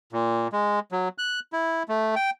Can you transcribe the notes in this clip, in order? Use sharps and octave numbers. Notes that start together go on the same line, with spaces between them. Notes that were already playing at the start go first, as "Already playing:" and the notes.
A#2
G#3
F#3
F#6
E4
A3
G5